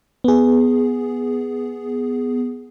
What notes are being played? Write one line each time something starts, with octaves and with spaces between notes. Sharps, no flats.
B3 G#4